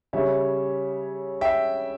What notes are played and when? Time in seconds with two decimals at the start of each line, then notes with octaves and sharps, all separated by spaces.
0.13 C#3 G3 C#4 C#5 E5
1.41 E5 G5